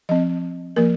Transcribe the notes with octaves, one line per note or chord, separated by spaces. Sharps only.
F3 C4 D#5
F3 A#3 A#4